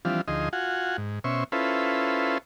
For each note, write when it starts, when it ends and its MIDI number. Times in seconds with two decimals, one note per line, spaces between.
0.05 0.21 52
0.05 0.21 53
0.05 0.21 55
0.05 0.21 60
0.05 0.21 62
0.05 0.21 65
0.28 0.49 38
0.28 0.49 53
0.28 0.49 63
0.28 0.49 68
0.28 0.49 75
0.28 0.49 84
0.53 0.97 65
0.53 0.97 66
0.53 0.97 78
0.53 0.97 80
0.98 1.19 44
1.24 1.44 47
1.24 1.44 61
1.24 1.44 72
1.24 1.44 76
1.24 1.44 85
1.52 2.38 61
1.52 2.38 64
1.52 2.38 65
1.52 2.38 69
1.52 2.38 71
1.52 2.38 72